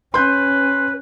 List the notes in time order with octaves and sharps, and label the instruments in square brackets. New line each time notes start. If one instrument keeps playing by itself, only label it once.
[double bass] C#4 [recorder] B4 [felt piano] C6 G6